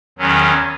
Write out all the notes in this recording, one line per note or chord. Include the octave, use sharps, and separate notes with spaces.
E2 D#3 F#3 C#4